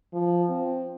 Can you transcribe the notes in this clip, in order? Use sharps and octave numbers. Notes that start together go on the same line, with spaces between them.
F3
C4